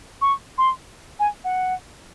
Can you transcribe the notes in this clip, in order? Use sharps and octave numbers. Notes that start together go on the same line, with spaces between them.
C#6
C6
G#5
F#5